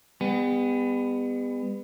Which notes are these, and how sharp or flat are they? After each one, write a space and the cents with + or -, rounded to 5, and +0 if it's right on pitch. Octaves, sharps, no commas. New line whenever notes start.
G3 +45 B3 +15